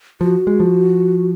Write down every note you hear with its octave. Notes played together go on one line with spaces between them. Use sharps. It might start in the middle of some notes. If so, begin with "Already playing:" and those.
F3 F#4
G#3
F3